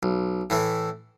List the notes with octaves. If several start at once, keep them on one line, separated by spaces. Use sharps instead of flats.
B1
A2 E3 A3